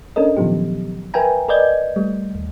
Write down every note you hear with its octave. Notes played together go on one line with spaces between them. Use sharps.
C#4 D4 A4 A#4 D#5
A#2 D#3 F3 F#3 B3 G4
A#4 B4 E5 G5 G#5 A#5
A#4 B4 D5 D#5 G6 G#6
G3 A3
D#2